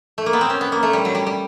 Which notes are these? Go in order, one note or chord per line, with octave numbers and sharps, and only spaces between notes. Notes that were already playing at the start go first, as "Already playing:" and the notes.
A3
A#3
B3
C4
C#4
B3
A#3
A3
G3
F#3
G3
G3